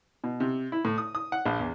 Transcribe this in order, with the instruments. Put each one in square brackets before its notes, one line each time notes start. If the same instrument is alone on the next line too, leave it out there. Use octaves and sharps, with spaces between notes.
[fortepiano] B2
C3
E4
A2
D#6
D#6
F#5
A#1
E2